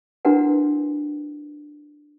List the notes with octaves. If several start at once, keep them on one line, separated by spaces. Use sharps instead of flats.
D4 E4 F#4 A#4 B4 F#5